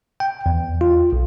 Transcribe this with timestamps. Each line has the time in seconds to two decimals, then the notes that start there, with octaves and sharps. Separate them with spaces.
0.20 G5
0.46 E2
0.81 F4
1.13 B1